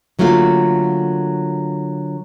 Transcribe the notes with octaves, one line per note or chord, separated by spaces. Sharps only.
D3 F#3 A3 A#3 F4